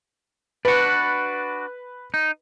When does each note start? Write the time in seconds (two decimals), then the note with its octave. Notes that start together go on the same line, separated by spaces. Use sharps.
0.65 D4 F#4 B4
2.14 D#4